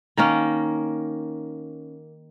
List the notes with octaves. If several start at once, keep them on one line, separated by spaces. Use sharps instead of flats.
D#3 A#3 C#4